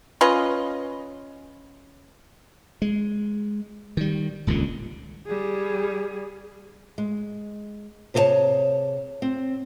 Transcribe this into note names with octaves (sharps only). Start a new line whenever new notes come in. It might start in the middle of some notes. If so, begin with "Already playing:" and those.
C#4 F4 B4 D#5
G#3
D#3 G3
D#1 C#2 A#2 D3
G3 G#4
G#3
C3 G#4 A4 C5 C#5 A5
C4